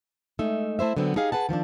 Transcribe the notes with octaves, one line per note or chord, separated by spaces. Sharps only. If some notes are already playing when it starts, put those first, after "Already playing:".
G#3 A3 D#4 E5
A3 E4 C5 E5
D3 F#3 B3 C4
D#4 G4 G#4 F5
G#4 B4 F#5 A5
D#3 F3 C4 D4